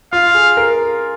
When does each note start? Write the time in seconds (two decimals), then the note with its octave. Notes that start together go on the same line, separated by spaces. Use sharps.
0.13 F4 F5
0.34 G#4
0.57 A#4